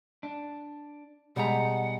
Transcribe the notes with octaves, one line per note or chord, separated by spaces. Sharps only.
D4
B2 G3 G#3 D#4 F#5 A#5